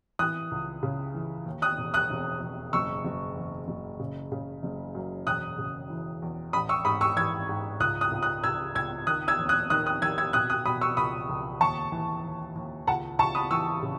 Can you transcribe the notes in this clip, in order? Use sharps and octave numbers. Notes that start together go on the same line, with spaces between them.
E3 D#6 F#6
C#2
C#3
E3
D#2
D#6 F#6
E1
D#6 F#6
E1
E1
F#1 C#6 E6
F#1
E2
F#1
C#3
C#3
F#1
F#2
E1 D#6 F#6
C#3
E3
E2
A1 B5 D#6
C#6 E6
G#2 B5 D#6
C#6 E6
E3 E6 G#6
G#2
C#2 D#6 F#6
D#6 F#6
C#2
D#6 F#6
C#2 E6 G#6
C#2 E6 G#6
D#3 D#6 F#6
E6 G#6
D#2
D#6 F#6
D#3 D#6 F#6
D#6 F#6
D#3 E6 G#6
E6 G#6
B2 D#6 F#6
D#6 F#6
B2 B5 D#6
C#6 E6
C#2 B5 D#6
C#2
D#2 A5 C#6
E3
D#2
D#2
C#2 F#5 A5
C#2 A5 C#6
B5 D#6
E3 C#6 E6
C#3